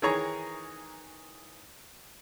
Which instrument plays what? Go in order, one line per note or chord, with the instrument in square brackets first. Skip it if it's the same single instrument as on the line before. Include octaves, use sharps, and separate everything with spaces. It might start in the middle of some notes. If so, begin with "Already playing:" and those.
[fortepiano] D#3 E3 G#4 C#5 A#5 C#6